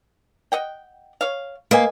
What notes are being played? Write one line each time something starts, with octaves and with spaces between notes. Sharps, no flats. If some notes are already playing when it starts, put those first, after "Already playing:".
D#5 F#5 G5
C#5 F5
A#3 B4 D#5 G#5